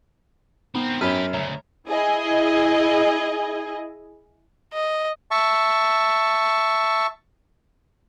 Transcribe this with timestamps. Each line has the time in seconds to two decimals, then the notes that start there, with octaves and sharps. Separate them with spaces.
0.75 B3 C4 D#4 A#4 B5
1.01 F#2 G4 B4 C#5 B5 F6
1.33 D2 C#3 C#5 E5 A#5
1.88 E4 G#4 D#5
4.73 D#5
5.31 E5 A5 C#6